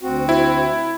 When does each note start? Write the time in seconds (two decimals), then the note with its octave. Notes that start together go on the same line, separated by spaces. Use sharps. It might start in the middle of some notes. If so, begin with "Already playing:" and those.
0.02 D2 C4 F#4
0.29 E4